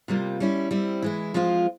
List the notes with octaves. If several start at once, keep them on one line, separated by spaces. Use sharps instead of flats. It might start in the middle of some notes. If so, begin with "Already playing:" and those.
C3 G3 A#3 F4
G3 C#4 E4
G3 C4 E4
E3 G#3 E4
F3 G#3 C4 F4